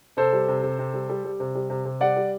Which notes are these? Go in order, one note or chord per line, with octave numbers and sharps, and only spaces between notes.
C3 A4 C5
G3
C3
C3
C3
G3
G3
G3
C3
G3
C3
C3
G3 D5 F#5
G3